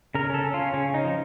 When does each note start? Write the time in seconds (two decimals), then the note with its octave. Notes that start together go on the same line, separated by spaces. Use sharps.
0.15 C#3 A#4
0.30 C#4 A4
0.44 C#4
0.54 F4
0.59 C#4
0.74 C#3 C#4
0.90 C#4 D#4
1.04 F3